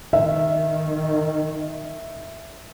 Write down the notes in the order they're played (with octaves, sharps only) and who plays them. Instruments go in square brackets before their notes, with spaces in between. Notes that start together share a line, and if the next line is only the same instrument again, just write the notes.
[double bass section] D#3 [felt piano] E5